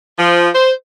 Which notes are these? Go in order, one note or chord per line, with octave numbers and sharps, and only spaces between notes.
F3
C5